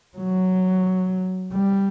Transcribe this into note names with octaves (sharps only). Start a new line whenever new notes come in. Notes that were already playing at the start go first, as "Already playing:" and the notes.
F#3
G3